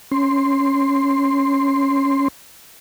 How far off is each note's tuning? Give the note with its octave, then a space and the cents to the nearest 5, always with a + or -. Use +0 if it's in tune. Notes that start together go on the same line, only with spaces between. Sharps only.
C#4 +0 C6 +0